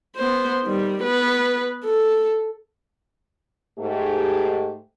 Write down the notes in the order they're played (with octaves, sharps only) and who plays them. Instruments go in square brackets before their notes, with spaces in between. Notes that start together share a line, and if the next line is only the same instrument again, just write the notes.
[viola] B3 C5
D#3 G3
B3 B4
A4
[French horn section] G#2 A3 G4